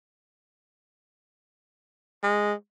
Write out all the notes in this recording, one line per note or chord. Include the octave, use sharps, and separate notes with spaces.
G#3